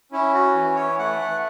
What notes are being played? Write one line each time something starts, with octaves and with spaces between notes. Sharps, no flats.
C#4 E4
F#4
E3
C#5
A3 F#5